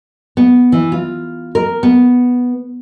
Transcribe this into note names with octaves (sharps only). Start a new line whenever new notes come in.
B3
E3
F4
A#4
B3